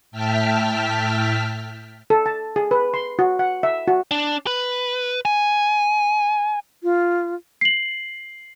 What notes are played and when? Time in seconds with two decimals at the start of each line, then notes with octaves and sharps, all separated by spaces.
0.11 A2 E5 G5 A5 F6 B6
2.10 A4
2.26 A5
2.56 G#4
2.71 B4
2.94 C6
3.19 F#4
3.39 F#5
3.63 E5
3.88 F#4
4.11 D4
4.47 B4
5.25 G#5
6.83 F4
7.61 C7 F#7